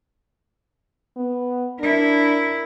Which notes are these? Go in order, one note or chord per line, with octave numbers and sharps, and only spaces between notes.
B3
D4 E4 A#4